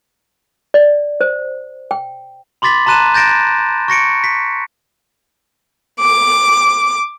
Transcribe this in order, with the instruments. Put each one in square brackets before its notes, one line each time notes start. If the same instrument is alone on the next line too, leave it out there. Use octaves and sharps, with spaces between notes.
[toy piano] D5
C5
G5
[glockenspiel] B5 C6 D6 A6 B6 F#7
A5 A#5 C6 F#6 D#7 E7
G6 A6 A#6 D7 E7
C#6 A#6 C#7 D7
B6
[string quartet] D6